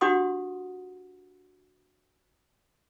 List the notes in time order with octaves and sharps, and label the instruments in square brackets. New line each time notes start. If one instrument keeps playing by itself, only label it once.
[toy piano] D4 F#4 G4 F#5 C6 D#6